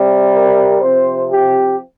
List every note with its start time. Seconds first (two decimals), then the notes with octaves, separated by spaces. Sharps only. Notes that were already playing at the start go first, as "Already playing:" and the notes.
Already playing: C3 G3 C4
0.32 A#4
0.81 C3 F3 C4 C5
1.31 G4